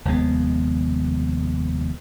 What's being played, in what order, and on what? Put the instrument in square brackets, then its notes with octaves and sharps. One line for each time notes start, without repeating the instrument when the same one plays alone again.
[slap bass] F1 D#2 G#3 B3